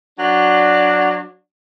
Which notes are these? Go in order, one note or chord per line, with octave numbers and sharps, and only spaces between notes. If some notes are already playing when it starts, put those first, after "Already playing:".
F#3 D4